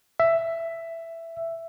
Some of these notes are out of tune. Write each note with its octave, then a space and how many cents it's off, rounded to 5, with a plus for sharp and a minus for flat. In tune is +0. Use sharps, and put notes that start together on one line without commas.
E5 +10